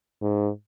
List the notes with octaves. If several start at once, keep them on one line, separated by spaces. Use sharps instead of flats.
G#2